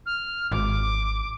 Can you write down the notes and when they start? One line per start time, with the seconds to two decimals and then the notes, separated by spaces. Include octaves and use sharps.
0.06 F6
0.52 G#1 D6